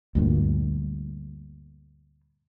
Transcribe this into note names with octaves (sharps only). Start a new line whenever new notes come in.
D2 G2 A#2